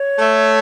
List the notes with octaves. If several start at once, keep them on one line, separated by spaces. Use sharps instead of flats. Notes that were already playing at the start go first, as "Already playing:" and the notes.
Already playing: C#5
A3